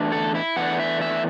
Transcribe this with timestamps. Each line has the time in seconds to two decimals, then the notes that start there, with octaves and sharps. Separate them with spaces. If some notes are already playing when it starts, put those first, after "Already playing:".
Already playing: E2 E3 A3 D4
0.12 A4
0.35 E4
0.56 E2 E3 A3 D4 F#5
0.80 E5
1.01 E5